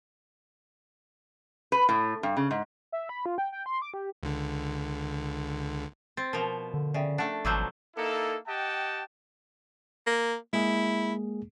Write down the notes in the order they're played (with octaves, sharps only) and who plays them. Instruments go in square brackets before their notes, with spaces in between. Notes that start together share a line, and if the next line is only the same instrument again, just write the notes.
[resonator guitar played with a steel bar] B4
A2
G2
C#3
G#2
[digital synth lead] E5
B5
F4
G5
G5
C6
D6
G4
[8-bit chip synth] C#2 D3
[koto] C4 [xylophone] A6
[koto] B2 F3 [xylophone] A#4 F7
[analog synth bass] D3
[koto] C#3 [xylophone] D5 E5 G5
[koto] A3 D4 [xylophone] F#5
[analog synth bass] G#1 [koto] B2 F3 F#3 [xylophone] D6 E6 G6
[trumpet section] A#3 D#4 E4 A4
G4 D#5 F#5 G5 A5
[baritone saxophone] A#3
[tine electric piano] G#3 A#3 G#4 [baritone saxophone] E4